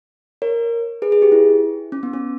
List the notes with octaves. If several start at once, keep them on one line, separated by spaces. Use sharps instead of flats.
A#4 C#5
G#4 B4
G#4
G4
E4
C#4
B3
C#4